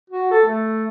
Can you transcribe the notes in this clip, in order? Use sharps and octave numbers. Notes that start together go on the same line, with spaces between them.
F#4
A4
A3